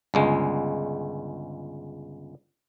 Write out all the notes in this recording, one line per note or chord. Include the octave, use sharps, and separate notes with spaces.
G1 C#2 G#3